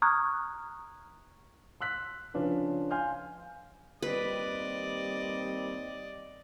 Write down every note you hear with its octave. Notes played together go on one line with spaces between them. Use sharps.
A#5 C#6 D#6 F6 F#6 G#6
C6 E6 F#6 B6
C#3 F3 C#4 D4 F4 B4
F5 G#5 C6 F6 G6
D#2 G3 C4 B4 D5 D#5